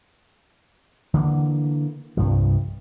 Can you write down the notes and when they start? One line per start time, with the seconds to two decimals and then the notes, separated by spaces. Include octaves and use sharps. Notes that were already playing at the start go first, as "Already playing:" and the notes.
1.14 D3 E3 A3 A#3
2.17 C2 G2 F3